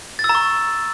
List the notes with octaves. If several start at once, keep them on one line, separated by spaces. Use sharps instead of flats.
A6
E6
A#5
C#6